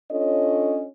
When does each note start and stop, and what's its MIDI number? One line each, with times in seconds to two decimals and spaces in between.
0.11 0.85 61
0.11 0.85 62
0.11 0.85 65
0.11 0.85 69
0.11 0.85 73
0.11 0.85 75